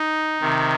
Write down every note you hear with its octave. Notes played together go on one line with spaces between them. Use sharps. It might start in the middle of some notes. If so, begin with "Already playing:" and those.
Already playing: D#4
C3 D#3